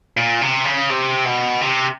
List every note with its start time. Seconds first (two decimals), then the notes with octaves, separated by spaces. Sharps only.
0.17 A#2
0.41 C3
0.65 C#3
0.89 C3
1.25 B2
1.61 C3